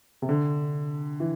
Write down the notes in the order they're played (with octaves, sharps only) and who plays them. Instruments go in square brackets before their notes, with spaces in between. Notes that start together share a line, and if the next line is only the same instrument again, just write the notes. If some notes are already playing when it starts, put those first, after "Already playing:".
[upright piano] C3
D3
E3